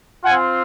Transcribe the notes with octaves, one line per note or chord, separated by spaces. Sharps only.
C4 F4 F#5 G#5